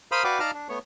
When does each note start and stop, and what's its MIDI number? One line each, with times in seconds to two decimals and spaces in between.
0.12 0.24 70
0.12 0.24 72
0.12 0.24 77
0.12 0.24 83
0.12 0.24 87
0.12 0.24 89
0.24 0.40 66
0.24 0.40 71
0.24 0.40 74
0.24 0.40 77
0.24 0.40 79
0.24 0.40 86
0.40 0.51 63
0.40 0.51 74
0.40 0.51 77
0.40 0.51 81
0.40 0.51 82
0.40 0.51 89
0.54 0.68 62
0.69 0.79 57
0.69 0.79 59
0.69 0.79 73